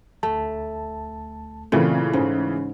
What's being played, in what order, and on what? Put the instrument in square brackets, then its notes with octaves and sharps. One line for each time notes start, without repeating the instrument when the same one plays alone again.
[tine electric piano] D2 A5 [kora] A3
[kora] A#2 [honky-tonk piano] C#3 E3 A3 [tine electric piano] C4
[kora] G#2 [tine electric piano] C#4